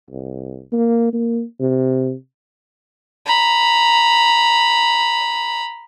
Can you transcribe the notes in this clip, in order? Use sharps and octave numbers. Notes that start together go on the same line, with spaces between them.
C2
A#3
A#3
C3
A#5 B5